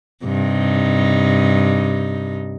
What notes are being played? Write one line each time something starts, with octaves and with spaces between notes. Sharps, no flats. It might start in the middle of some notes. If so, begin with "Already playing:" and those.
G2 C3 D#4